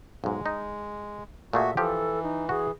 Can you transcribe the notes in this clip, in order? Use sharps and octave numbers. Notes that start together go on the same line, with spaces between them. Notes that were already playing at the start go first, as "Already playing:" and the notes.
B1 G#2 G#3
D#4
A#2 A3 F#4 G#4 E5
E3 F3 G4 A4
D#4
F#4 G#4